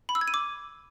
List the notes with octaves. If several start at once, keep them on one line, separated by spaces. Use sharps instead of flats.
B5
E6
G#6
D#7
D6